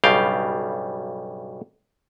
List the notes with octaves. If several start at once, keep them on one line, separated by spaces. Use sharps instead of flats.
B1 G2 C#3 G3 F5 G5